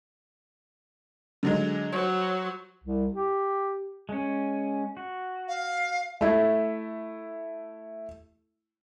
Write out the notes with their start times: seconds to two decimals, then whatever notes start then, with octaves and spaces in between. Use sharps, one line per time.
1.43 D3 F#3 G#3
1.93 F#3 C5 C#5
2.84 C2
3.14 G4
4.09 G#3 C#4
4.97 F#4
5.48 F5
6.21 A3 E4